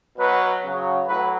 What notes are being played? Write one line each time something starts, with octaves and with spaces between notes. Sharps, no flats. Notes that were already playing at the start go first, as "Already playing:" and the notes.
B2 F#3 B4
C#3 F#3
A2 F#3 B4